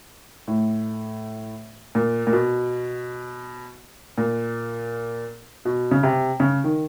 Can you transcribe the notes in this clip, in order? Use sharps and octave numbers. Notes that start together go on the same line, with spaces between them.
A2
A#2
A#2
B2
A#2
B2
C#3
C3
C#3
D#3